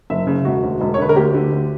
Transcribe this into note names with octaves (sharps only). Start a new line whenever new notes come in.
F#1 E5
C#3
E1 F#4
D2
E1
C#5
D3 B4
A#4
D2 G4
D3
D2